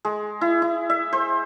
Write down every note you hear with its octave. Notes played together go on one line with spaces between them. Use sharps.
G#3
E4
E4
E5
C5